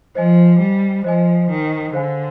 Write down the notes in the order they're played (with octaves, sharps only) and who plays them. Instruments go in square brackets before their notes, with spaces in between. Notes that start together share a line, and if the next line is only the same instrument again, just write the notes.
[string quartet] F3 [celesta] C5 D#5 G#5
[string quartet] G3
[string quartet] F3 [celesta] C5 D#5 G#5
[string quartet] D#3
[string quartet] D3 [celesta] G#4 C5 F5 G#5